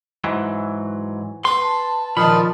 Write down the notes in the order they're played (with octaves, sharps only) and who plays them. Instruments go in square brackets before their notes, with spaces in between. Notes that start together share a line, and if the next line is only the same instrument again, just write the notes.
[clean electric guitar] G#2 E3 F#3
[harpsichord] B4 F#5 [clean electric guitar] C6
[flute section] A5
[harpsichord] A#2 D#3 [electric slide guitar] F3 [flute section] A5 D#6 F6 [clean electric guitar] B5